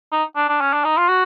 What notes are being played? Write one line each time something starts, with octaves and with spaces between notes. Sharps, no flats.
D#4
D4
D4
C#4
D4
D#4
F4
F#4